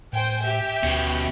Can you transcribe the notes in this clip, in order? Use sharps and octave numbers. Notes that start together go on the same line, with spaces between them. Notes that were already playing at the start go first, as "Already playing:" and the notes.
A2 C5 G5 G#5
G4 E5
D2 B2 C#4